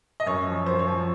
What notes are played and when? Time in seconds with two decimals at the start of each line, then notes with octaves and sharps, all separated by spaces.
0.20 D#5
0.26 F#2 C#5
0.47 F3
0.66 F#2 C5
0.79 C#5
0.87 F3